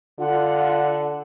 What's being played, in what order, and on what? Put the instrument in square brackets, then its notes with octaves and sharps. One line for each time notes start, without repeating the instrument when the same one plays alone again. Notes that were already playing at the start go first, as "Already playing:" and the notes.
[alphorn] D3 [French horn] F4 [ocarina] F#5